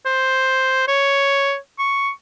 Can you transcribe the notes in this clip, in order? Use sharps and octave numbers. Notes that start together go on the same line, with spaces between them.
C5
C#5
C#6